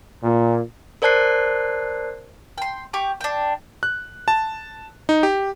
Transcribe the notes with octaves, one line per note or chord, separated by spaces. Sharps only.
A#2
A#4 C5 D5 A5 F#6 C7
G5 C6
G4 C#6 D6
D4 G5
F#6
A5
D#4
G4